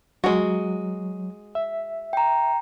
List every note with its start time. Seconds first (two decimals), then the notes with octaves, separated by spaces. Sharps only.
0.24 F#3 G#3 F#4
1.55 E5
2.13 G5 A#5